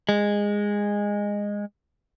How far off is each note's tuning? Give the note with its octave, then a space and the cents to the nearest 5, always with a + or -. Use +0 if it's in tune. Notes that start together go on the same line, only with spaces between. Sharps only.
G#3 -15